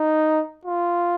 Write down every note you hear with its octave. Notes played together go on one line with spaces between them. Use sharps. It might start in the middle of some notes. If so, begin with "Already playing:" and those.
Already playing: D#4
F4